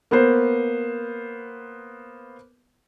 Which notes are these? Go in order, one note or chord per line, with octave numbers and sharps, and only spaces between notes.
A#3 B3 C5